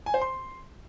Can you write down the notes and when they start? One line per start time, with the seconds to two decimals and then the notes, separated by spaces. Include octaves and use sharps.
0.06 G#5
0.14 C5
0.22 C6